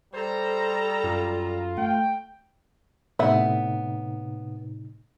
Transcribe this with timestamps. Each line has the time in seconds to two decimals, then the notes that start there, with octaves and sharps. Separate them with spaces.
0.13 G3 A4 C5 A#5
1.04 F#2 F4
1.78 A3 G5
3.19 A2 C3 B3 D#4 E5 F#5